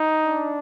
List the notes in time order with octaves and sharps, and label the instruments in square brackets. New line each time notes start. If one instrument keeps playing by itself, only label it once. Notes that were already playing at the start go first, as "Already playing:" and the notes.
Already playing: [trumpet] D#4
[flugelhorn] D4